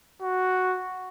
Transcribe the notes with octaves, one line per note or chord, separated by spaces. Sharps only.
F#4